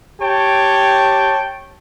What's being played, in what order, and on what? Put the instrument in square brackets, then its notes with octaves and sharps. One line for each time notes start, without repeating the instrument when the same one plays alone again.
[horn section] G4 C#5 G5 A5